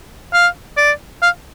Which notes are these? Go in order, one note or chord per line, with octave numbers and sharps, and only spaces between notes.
F5
D5
F5